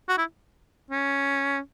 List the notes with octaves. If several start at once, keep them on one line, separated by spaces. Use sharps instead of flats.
F#4
E4
C#4